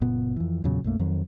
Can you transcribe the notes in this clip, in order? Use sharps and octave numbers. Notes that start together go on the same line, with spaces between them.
F#1 A#2 B3
F2 E3
E2 A#2 C#3 F#3
B1 F#2 A3 A#3
F2 D#3 F#3